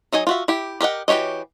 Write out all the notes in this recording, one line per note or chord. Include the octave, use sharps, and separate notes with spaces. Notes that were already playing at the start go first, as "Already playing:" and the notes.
F#3 D#4 D#5 G#5
F4 F#4 E5
E4 G4
G4 A#4 D#5 F#5
E3 F#4 G4 C#5 D#5